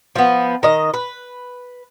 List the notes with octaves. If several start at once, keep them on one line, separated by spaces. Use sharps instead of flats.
F3 B3
D#3 D#5
B4